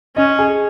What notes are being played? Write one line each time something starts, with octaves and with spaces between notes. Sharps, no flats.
C#4 D#5
G#4